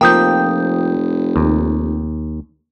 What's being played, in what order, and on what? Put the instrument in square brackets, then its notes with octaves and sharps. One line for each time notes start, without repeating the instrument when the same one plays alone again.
[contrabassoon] F1 [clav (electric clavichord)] F3 A#3 [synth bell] G5 D#6 G6
[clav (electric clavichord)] D#2